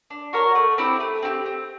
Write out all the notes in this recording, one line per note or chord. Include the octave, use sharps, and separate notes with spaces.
D4
F#4 A#4 C#5
A3
C4 E4 G4
A3
C4 E4 G4
C4